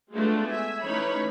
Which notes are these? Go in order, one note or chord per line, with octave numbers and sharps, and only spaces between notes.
G#3 A3 B3 D4 F4
E5 G#5
E3 A3 C#4 D#4 C#5 B5